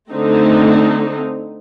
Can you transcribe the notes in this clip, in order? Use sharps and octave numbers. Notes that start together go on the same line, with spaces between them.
D3 A3 C4 D#4